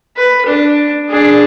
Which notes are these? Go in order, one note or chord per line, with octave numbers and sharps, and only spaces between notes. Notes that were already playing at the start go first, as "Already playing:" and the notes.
B4
D4
D4 G#4